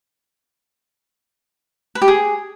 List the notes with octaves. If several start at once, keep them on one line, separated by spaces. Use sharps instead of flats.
B4
G4
G#4